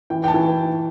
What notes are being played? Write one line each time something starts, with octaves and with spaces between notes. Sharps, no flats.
E3 G5
G5
A5
E3